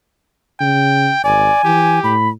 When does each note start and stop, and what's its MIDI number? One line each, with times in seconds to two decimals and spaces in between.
0.61 1.11 49
0.61 1.21 79
1.24 1.49 32
1.24 1.60 74
1.24 2.00 80
1.64 2.01 52
1.64 2.15 67
2.04 2.30 45
2.04 2.29 83